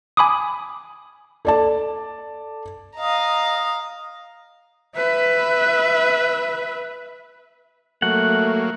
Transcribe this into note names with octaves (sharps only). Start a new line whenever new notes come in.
G#5 B5 D6 D#6
A4 D5 A5
D#5 F5 A#5
B4 E5
F#3 A3 A#3 F#5